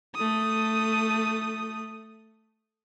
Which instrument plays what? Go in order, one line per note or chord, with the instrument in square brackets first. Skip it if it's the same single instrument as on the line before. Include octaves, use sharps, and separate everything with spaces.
[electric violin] A3 D#6